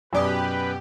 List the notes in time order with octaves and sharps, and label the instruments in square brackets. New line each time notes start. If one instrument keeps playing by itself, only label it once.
[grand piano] F#2 [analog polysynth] B2 G4 [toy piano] E4 D5 D#6 [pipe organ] B4